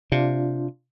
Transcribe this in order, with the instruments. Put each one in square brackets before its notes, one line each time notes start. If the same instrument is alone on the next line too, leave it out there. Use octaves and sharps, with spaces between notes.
[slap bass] C3 [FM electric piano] D4 F4